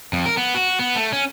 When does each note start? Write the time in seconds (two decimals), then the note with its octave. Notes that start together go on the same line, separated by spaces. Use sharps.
0.13 F2
0.26 A#4
0.37 B3
0.55 F#4
0.79 B3
0.96 A3
1.13 C#4